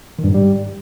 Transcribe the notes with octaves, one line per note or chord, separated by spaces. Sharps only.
D#3
G2
G#2
G3